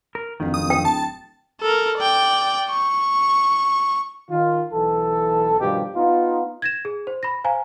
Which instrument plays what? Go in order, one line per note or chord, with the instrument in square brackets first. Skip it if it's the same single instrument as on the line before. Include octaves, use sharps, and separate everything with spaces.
[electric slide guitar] A#4
[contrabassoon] D1 [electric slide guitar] F2 D#3
[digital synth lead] D#6
[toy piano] G5
[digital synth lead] A5
[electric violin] A4 A#4
D5 G5
C#6
[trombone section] D#3 F4
B1 E3 A4
G2 B2 D#3 F3 G4
B3 D#4 F4
[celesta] G#6 A#6 E7
G#4
C5
B5 A#6
C5 F5 G#5 A#5